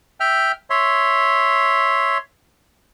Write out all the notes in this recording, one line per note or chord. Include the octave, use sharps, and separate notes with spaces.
E5 G5 F6
C#5 E5 C6